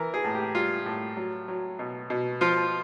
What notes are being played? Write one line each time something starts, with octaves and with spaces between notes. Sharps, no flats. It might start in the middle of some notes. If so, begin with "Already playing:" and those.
Already playing: E3 A#4
G#4
A2
G4
G3 F4
A2
F#3
F#3
B2
B2
F3 F4